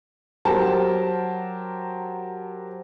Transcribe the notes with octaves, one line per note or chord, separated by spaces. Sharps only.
F#3 G4 A#4 C5 A5